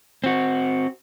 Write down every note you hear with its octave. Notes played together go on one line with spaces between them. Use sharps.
C4 F#4